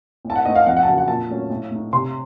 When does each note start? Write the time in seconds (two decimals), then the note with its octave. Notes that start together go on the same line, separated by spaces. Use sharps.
0.25 A2
0.30 A5
0.36 F#5
0.45 A3 C4 D#4 D#5
0.56 F5
0.66 F2 F#5
0.77 F#5
0.83 A5
0.87 C#3 F#3 F#5
0.98 F#5
1.08 A#2 A5
1.30 F#3 A3 C#4
1.50 A2
1.71 A3 D#4
1.93 C3 C6